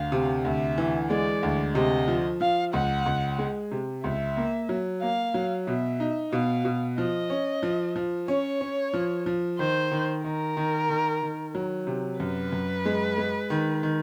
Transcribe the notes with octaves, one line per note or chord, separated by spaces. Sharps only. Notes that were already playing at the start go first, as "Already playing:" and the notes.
Already playing: D2 F5
C3
D2 E5
E3
G#3 D5
D2
C3 D#5
F3
F3 F5
C#2 F#5
C#2
G#3
C3
C#2 E5
A#3
F#3
A#3 F5
F#3
B2 E5
D#4
B2 F5
B2
F3 D#5
C#4
F3
F3
C#4 C#5
C#4
F3
F3
D#3 C5
D#3
D#3 A#4
D#3
D#3
D#3
F#3
C3
F#2 B4
F#2
G#3
G#3
D#3
D#3